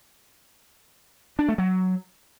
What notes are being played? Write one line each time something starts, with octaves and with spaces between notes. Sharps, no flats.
D4
A3
F#3